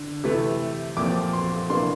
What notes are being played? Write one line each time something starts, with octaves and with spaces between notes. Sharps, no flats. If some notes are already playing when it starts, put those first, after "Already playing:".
Already playing: D3
C3 E3 A3
A#2 F3 C4 D6
C6
C3 E3 A#3 D4 C6